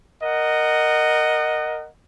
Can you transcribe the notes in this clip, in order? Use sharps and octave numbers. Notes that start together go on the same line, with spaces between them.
A#4 D#5 F#5